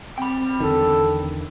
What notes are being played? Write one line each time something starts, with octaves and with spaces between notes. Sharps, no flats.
C4 G5 B5
E2 D3 D#3 A4